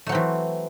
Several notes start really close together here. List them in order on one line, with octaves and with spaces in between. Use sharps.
A3 F#3 C4 E3